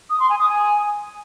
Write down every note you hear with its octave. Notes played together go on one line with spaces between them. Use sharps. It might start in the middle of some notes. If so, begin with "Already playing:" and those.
D#6
C6
G#5
D#6
G#5